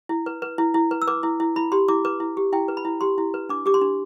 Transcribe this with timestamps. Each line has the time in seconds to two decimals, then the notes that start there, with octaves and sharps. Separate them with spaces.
0.09 E4
0.26 B4
0.42 B4
0.58 E4
0.74 E4
0.91 B4
1.02 E6
1.07 B4 D6
1.23 E4
1.40 E4
1.56 E4 B5
1.72 G4 C6
1.88 E4 D6
2.05 B4 D6
2.20 E4
2.37 G4
2.53 E4 G5
2.68 B4
2.77 B5
2.85 E4
3.01 G4 C6
3.18 E4
3.34 B4
3.49 D4 D6
3.66 G4 D6
3.74 C6
3.82 D4